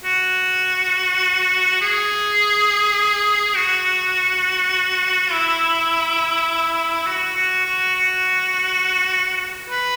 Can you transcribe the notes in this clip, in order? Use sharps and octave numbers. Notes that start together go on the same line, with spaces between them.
F#4
G#4
F#4
E4
F#4
F#4
F#4
F#4
B4